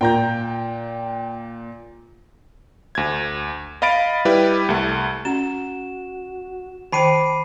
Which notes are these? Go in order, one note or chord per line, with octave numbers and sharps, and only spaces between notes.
A#2 G5 A#5 G6
D2 G#6
D#5 F5 B5 A6 D7
G3 E4 G4 B4
C2 A3
C#4 F#4 E7
D#3 C5 G5 A5 B5 D6 C7 D#7